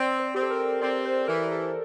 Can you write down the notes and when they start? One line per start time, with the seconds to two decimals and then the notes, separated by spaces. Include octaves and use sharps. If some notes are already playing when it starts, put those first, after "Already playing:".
Already playing: C4 D5
0.20 C5
0.34 C4 G4
0.42 A4
0.50 A#4
0.81 C4 D5
1.05 C5
1.28 E3 A#4
1.51 A4